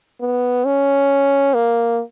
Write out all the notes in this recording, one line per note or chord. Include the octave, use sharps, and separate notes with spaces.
B3
C#4
A#3